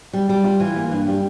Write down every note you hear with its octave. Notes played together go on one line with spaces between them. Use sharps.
G3
G3
F4
E3
A#3
G2
G3